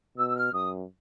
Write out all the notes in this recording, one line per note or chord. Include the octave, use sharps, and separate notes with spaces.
B2 E6
E6
F6
F#2 D#6